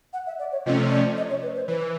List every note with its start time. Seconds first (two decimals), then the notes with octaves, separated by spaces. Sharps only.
0.13 F#5
0.26 E5
0.39 D5
0.52 C#5
0.66 C3 F3 A3 C#4 D#5
0.91 D5
1.17 D#5
1.30 C#5
1.43 B4
1.56 C5
1.68 E3 B4